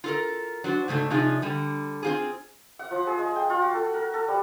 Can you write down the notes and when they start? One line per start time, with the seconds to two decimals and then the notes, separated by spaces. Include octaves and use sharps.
0.04 F4 A4 A#4
0.64 F#3 D4 C5
0.88 G#2 C#3 A3 D4
1.10 C3 F3 D4 D#4 F4 G#4
1.42 D3 G3
2.03 C4 F4 G#4
2.79 F#5
2.91 F3
3.07 G#4
3.19 G#3
3.36 G5
3.50 F4
3.62 F#4
3.74 A4
3.94 A#4
4.14 A4
4.28 G3